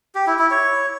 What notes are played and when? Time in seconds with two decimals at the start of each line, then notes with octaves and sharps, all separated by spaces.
0.15 G4
0.27 E4
0.39 E4
0.51 C#5